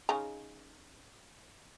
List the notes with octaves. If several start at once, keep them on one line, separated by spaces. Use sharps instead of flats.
C#3 D#4 A#5